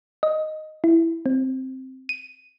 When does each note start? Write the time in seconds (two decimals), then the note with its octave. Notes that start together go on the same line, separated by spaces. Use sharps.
0.23 D#5
0.84 E4
1.26 C4
2.09 D#7